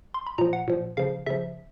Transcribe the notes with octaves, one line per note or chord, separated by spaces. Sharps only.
C6
B5
A#2 F3 A#5
F#5
A#2 F3
C#3 F3 F5
C#3 F3 E5